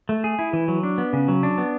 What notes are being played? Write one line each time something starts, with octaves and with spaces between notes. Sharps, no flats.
A3
G#4
E4
E3
F#3
D4
B3
C#3
F#3
D4
B3